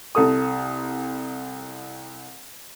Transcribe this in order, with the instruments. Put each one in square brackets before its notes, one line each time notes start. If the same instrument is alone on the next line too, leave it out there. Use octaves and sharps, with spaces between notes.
[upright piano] C2 A4 D#6